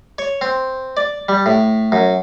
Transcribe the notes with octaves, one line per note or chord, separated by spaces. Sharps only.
C#5
C4
D5
G3
A2
F#2